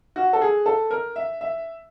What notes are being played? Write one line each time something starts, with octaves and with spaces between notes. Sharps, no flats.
F#4
A4
G#4
A4
A#4
E5
E5